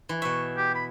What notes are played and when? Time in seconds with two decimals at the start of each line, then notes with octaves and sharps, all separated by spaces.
0.09 E3
0.22 B2 E5 C#6
0.57 G4
0.75 B5